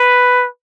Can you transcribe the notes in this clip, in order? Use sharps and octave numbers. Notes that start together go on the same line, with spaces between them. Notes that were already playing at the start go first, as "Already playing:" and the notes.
Already playing: B4